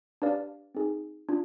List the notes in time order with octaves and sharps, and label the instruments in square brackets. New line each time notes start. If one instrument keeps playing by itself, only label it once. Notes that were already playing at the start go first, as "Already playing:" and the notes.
[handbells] D4 G4 B4 D5 F5
C4 D#4 G#4
D4 F4